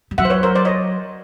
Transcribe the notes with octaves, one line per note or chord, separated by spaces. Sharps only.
G3
F#3 E5 F#5
C5
B4 C#5
A#4 C5
C5 D5
C#5 D#5